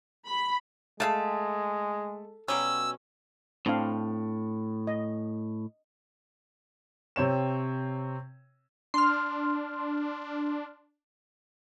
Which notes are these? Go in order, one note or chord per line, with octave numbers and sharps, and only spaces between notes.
B5
G#3 A3 G#4 F5 A5
B2 F#3 G3 C#4 E6
A2 C4 D4 F5
D#5
C3 C4 C#5 E7
D4 C6 F6